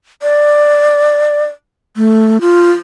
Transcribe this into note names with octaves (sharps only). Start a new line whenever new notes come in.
D5
A3
F4